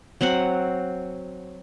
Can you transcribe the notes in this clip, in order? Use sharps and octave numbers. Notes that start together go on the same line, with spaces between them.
F#3 C4 F#4 F#5